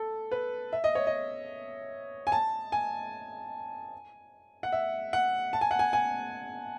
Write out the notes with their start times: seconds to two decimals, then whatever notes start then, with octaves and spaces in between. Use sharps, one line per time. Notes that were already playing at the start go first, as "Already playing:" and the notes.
Already playing: A4
0.31 B4
0.73 E5
0.84 D#5
0.95 C#5
1.07 D#5
2.27 G#5
2.32 A5
2.72 G#5
4.63 F#5
4.72 E5
5.13 F#5
5.53 A5
5.61 G#5
5.71 F#5
5.79 G#5
5.93 G#5